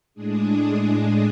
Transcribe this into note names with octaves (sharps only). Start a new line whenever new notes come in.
A2 G#3 D4 G#4